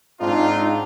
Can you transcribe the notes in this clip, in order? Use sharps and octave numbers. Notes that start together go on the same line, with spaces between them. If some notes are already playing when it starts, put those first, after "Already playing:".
G#2 C4 D4 D#4 F4